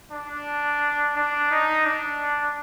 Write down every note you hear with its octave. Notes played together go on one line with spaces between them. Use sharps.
D4
D4
D#4
D4